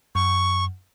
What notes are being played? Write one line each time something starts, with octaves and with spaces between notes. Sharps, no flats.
F#2 C#6